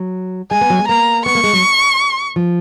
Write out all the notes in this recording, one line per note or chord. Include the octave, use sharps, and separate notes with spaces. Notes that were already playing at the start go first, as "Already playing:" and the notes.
Already playing: F#3
G#3 G#5
B3
F#3
G#3
A#3 A#5
B3 C#6
A#3
G#3
F#3
F3